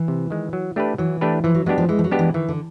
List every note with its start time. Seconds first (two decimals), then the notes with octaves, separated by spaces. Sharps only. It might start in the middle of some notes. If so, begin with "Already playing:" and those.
Already playing: E3
0.08 C3
0.30 D#3 G#3
0.53 F#3
0.76 A3 D4 G4 B4
0.98 E3 F#3
1.21 A3 D4 G4 B4
1.44 E3 F3
1.55 F#3
1.66 F#3 G#3 B3 D4 G4
1.78 F3
1.89 E3 G#3
1.99 F3
2.04 F#3
2.11 G#3 B3 D4 G4
2.19 E3
2.34 D#3 E3
2.49 D3